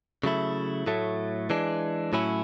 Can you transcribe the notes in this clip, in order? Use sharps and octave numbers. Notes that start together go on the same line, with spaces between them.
C#3 F#3 A3 E4
A2 F#3 A3
E3 G#3 D4
A2 F#3 C#4 E4